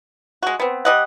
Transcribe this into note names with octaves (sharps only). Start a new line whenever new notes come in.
G#3 F#4
B3 C4
G3 D#5 F#5